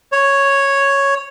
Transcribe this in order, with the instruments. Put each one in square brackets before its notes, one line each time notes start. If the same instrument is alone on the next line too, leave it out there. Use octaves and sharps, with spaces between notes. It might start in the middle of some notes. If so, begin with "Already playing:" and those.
[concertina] C#5